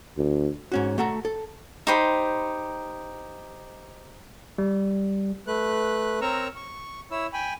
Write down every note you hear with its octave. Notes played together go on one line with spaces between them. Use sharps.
D2
G#2 C#4 F#4
A3 F#4 A4 A#5
A4
D#4 G4 C5 B5
G3
A3 B4 F#6
C4 A#4 C#5 A#5 C#6 E6
C#6
E4 C#5 E6
G5 G#5 B5